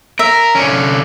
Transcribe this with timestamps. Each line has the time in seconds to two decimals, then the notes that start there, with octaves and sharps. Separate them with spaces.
0.19 A#4 E5
0.55 D3 C#4